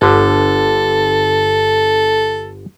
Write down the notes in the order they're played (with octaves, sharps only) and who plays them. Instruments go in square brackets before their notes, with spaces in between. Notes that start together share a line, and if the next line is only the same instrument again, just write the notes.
[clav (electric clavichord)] G1 D3 [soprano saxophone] A4